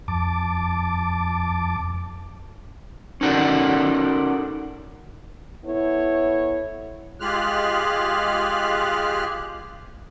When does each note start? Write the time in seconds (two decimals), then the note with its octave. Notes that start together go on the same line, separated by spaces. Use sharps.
0.08 F2 A5 D6
3.21 C#4 D#4 F#4 A4 A#4 D5
5.65 B3 E4 A4 C#5
7.20 G#3 F4 G4 G#4 F6 F#6